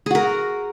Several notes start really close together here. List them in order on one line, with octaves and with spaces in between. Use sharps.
G#4 F#4 A#4